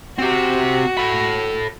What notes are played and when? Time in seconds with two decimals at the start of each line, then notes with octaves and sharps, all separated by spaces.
0.18 C4 F#4 G4
0.97 A4 B5